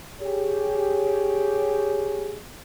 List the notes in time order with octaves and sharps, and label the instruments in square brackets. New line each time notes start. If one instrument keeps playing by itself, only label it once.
[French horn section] G4 G#4 C#5